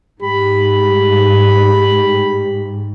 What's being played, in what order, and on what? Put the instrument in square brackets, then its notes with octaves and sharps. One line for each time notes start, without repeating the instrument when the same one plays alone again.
[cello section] G#2 [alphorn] G4 [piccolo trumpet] B5